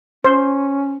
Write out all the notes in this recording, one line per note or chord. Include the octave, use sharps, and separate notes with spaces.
C#4 C5